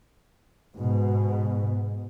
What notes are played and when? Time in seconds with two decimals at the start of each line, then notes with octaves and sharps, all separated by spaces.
0.75 G#2 B2